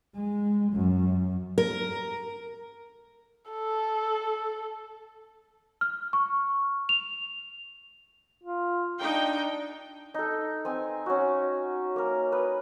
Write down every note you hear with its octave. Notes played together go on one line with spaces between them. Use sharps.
G#3
F#2
A#4
A4
F6
C#6
F7
F4
D4 D#4 G5
D#4 A4
C4 D#5 G#5
C#4 F#4
A#3 A#4
B4 D#5